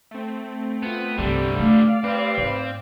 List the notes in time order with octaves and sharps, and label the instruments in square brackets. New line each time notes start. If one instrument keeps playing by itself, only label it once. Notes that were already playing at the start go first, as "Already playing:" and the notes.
[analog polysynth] A3 C4
[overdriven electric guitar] B3 [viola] F4
[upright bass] C2 G2 [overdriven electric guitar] D3 G3 [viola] G4 A4
[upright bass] A3 [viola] D5 F5
[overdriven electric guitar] C4 [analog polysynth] G4 B4
[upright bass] G#2